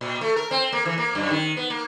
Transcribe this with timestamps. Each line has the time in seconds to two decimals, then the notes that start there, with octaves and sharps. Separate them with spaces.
0.01 A#2
0.21 A3
0.36 A#4
0.51 C4
0.72 A#3
0.86 E3
0.98 A#3
1.15 F#2
1.30 D#3
1.57 B3
1.70 A#3